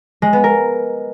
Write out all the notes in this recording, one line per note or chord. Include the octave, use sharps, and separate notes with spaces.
G#3
B3
A#4